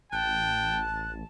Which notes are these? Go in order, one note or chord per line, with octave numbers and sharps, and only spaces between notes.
A1 G5 A5 F#6